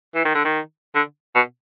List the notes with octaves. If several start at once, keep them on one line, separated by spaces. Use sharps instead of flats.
E3
D#3
D3
D#3
D3
B2